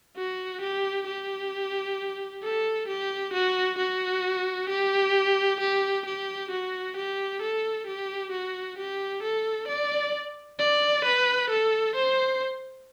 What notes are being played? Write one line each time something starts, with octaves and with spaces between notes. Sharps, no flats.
F#4
G4
G4
A4
G4
F#4
F#4
G4
G4
G4
F#4
G4
A4
G4
F#4
G4
A4
D5
D5
B4
A4
C5